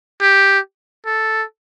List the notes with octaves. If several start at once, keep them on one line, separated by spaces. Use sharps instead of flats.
G4
A4